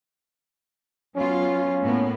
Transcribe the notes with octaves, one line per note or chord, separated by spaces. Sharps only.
F#3 B3 C#4 F4
A2 A#3 B3